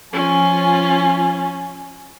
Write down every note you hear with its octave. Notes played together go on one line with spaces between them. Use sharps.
F3 C#4 F4 G#5